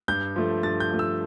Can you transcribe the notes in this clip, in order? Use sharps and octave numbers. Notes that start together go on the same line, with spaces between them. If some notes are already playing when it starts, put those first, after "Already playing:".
G2 G6
F3 A3
G2 A6
G6
F3 A3
E6